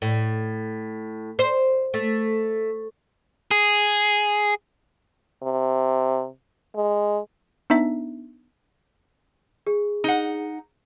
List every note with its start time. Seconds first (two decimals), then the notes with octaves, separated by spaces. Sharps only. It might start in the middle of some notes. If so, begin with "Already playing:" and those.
0.02 A2
1.39 C5
1.94 A3
3.51 G#4
5.43 C3
6.75 G#3
7.70 B3 D4 D#4 E5
9.67 G#4
10.04 D#4 F#5